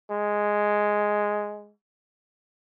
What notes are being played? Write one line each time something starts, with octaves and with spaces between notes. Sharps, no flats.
G#3